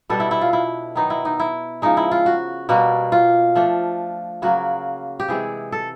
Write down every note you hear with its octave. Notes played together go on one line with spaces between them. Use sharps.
B2 G3 B3 D4 A4
E4
E4
F4
E4
D#3 F#3 B3 D#4
E4
D#4
E4
C#3 F3 G#3 D#4
E4
F4
F#4
B2 G3 A#3 F#4
F4
F3 A3 D4
C#3 F#3 A#3 F#4
G4
C3 E3 G#3 C4 G#4
A4